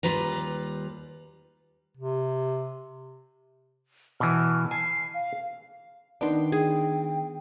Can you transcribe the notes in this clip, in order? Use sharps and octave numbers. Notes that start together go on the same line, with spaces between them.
D#2 F#3 G3 F4 B4 A#5
C3
B2 E3 F6
G#5 A5 C7
F5
D#3 B3 D4 G5 C6
G#4 G5